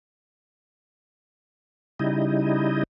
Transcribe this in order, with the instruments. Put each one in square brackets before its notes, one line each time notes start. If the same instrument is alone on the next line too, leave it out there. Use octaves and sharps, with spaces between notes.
[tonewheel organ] C#3 G3 D#4 E4 D#5